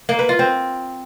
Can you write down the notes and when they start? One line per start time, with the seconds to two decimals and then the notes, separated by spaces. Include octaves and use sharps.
0.09 A#3
0.19 B4
0.29 F4
0.39 C4